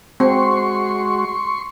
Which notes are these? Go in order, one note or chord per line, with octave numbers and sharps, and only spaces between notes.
G#3 C4 F#4 C6 C#6